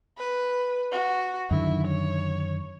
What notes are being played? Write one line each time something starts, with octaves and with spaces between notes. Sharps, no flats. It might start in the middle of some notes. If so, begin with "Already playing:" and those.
B4
F#4
F#2 D3 D#3 E4
C#5